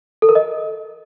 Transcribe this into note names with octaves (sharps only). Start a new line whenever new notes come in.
A4
A#4
D#5